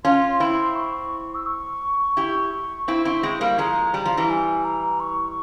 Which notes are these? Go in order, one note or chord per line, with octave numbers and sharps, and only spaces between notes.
C#4 F4 C6
C4 E4
C#6
E6
C#6
E4 G4
C4 E4
C4 E4
G#3 C4
G3 A#3
F3 G#3 A#5
G3
F3
E3 G3
G#5
A#5
C#6